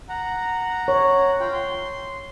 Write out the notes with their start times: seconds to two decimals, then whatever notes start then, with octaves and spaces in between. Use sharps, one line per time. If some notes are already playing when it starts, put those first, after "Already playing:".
0.09 F#5 A#5
0.88 C#5
1.40 F4 G5
1.53 C6